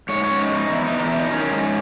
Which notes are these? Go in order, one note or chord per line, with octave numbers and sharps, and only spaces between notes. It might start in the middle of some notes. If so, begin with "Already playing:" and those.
G#2 C#5
C#5
C#4
D#4
G#2
D#4
E2 E4
D#4
E2
E4
B2
D#4
D#3 C#4
G#2